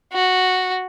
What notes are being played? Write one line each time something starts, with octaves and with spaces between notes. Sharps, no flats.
F#4